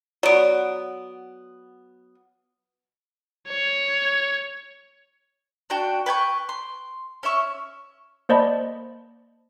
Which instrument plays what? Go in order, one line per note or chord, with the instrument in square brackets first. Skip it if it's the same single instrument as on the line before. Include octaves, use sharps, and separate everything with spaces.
[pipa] F#3 B3 [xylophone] D5 D7
[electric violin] C#5
[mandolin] D4 F#4 G5
B4 G5 G#5 C#6
C6
C#4 C#5 E5 C#6
[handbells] A#3 C5 D5 D#5 A5 B5